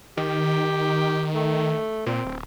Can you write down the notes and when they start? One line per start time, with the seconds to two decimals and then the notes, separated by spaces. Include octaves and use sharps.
0.17 D#3 G4
1.35 A3
2.06 A#2 C4
2.25 D1